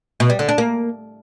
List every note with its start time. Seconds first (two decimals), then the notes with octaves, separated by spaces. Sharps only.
0.20 B2
0.30 G3
0.39 D3
0.49 D4
0.58 A#3